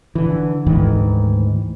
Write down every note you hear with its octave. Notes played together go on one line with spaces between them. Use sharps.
D3 E3
D2 G#2 D#3 E3